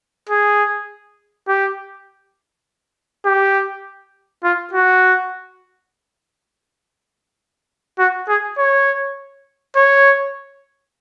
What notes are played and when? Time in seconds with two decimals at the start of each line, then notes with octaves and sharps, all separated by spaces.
0.29 G#4
1.48 G4
3.25 G4
4.44 F4
4.73 F#4
7.99 F#4
8.28 G#4
8.58 C#5
9.76 C#5